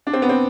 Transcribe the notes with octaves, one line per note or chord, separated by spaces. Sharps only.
D4
C4
B3
C4